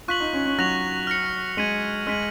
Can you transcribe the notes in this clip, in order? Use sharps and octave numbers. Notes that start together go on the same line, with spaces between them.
F4 C#6 F#6 B6 F#7
D#4
C#4
C#4
F#3 F#6 A#6 F7
F6 A#6 C#7
G#3 G#6 B6 D#7 F#7
G#3 F6 B6 D#7 F#7